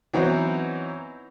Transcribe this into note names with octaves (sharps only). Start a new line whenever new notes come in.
E3 F#3 B3 C4 D#4 E4